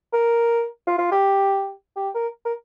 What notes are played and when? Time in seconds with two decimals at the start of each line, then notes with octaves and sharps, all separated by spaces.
0.13 A#4
0.87 F4
0.98 F4
1.12 G4
1.96 G4
2.15 A#4
2.45 A#4